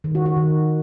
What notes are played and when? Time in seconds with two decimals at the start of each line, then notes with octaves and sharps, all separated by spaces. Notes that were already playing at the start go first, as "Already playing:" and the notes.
0.04 D#3
0.15 F#4
0.26 F#4
0.36 D#3